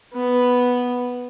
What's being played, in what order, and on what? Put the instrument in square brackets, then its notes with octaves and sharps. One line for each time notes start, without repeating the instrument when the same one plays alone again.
[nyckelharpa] B3